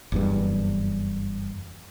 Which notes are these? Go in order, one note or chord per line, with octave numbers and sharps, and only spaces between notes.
F#1 E2 G2